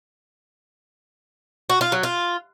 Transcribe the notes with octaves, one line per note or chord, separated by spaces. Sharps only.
F#4
F4
F#3
F4